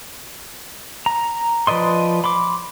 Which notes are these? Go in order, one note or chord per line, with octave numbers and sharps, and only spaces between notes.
A#5
F3 B4 D5 D#5 C6
B5 C6 D6